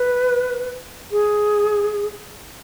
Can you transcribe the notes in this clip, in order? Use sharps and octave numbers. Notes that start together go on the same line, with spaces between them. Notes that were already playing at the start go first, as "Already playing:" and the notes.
Already playing: B4
G#4